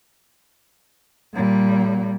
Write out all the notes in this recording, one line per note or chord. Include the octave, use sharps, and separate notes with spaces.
A#2 G3